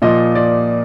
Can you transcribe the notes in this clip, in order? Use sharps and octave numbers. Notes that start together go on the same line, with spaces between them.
A#2 F3 D#5
D5